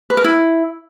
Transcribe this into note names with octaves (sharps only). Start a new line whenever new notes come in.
B4
A#4
E4